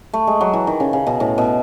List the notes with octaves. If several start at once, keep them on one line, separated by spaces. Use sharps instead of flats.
A3
G#3
F#3
E3
D#3
C#3
C#3
B2
A2
B2